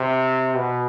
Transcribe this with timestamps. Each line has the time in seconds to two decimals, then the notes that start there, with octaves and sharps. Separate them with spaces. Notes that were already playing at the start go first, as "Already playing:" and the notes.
Already playing: C3
0.56 B2